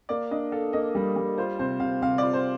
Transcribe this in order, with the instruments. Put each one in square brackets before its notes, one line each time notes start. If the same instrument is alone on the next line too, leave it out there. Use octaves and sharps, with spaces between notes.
[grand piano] A#3 [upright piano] D5
[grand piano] D4 [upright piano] D#5
[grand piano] A4 [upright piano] F5
[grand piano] A#3 [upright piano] D#5
[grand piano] G3
G3
[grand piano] F4 [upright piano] C5
[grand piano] C3 [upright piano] C5
[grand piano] C3 [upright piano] F5
[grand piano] C3 [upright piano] F5
[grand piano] F4 [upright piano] D5
[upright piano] C5